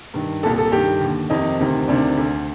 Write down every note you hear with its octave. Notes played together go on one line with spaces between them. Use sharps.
G2 D#3
C2 A#2 A4
A4
G2 D#3 G4
D#2 D3
F2 C3 D#3 D#4
D2 C3 D#3
D2 C3 D#3 D4
D2 D3